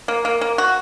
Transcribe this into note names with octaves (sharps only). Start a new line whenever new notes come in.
A#3
A#3
A#3
F#4